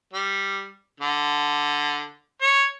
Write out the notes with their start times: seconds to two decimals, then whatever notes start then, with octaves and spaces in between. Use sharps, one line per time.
0.13 G3
1.00 D3
2.42 C#5